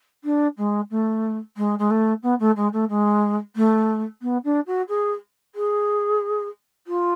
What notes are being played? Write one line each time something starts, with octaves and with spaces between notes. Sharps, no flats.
D4
G#3
A3
G#3
G#3
A3
B3
A3
G#3
A3
G#3
A3
B3
D4
F#4
G#4
G#4
F4